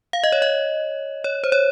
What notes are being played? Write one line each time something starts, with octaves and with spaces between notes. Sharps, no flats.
F5
D#5
C#5
D#5
C#5
C5
C#5